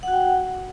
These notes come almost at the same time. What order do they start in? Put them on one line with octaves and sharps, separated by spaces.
F#5 F#4 G5